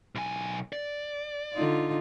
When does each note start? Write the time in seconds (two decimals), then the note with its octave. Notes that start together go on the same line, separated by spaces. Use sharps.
0.15 B1 G#5
0.73 D5
1.54 D3 D#4 F4